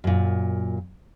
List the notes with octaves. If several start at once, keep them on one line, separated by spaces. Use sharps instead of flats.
F#2 A#2